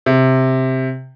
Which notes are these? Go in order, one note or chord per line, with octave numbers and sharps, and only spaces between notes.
C3